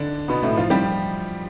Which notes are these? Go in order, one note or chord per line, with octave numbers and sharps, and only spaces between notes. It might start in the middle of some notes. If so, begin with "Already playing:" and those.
Already playing: D3 D4
B2 B3
A2 A3
F3 F4
G3 G4